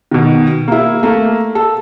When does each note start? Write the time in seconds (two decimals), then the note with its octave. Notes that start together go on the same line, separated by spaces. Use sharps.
0.11 B2 D#3
0.68 A#3 E4
1.03 A3 A#3
1.55 A4